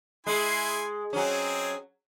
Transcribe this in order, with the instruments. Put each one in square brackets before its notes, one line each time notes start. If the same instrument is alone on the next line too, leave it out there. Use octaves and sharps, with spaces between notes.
[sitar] G#3 [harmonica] E4 G#5 C6
[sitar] F#3 C#4 [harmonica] C4 G#4 D#5